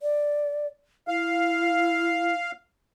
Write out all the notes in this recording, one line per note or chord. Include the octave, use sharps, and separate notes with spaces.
D5
E4 F5